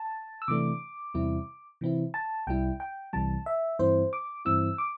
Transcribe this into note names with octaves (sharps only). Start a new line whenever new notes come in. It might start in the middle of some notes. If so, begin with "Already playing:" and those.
Already playing: A5
E6
C3 E3 A3 D4 D6
E2 C3 G3 C4 E4
C3 E3 C4 E4
A5
C2 C3 G3 E4 G5
G5
C2 C3 E3 G3 A5
E5
G2 E3 C4 E4 C5
D6
G2 E3 C4 E4 E6
D6